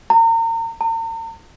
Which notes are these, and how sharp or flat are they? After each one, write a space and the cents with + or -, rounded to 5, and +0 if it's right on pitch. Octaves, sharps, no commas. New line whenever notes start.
A#5 -35
A#5 -45